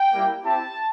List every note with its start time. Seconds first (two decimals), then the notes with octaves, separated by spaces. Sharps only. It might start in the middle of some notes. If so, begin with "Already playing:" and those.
Already playing: G5
0.13 G3 A#3 E4 G4
0.44 C4 E4 G4 A5